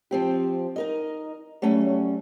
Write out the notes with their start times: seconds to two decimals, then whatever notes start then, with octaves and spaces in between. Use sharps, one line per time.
0.11 F3 C4 G4
0.76 D#4 A#4 D#5
1.62 F#3 G3 A3 C#4